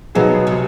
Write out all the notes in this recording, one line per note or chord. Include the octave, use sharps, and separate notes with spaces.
B2 F#3 B3 D#4 G#4
C3